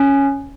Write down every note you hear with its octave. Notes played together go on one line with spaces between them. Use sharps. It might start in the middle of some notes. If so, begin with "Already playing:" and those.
Already playing: C#4